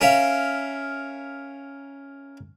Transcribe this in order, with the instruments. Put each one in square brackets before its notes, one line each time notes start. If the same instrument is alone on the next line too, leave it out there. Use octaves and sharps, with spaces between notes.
[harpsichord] C#4 A#4 E5 F5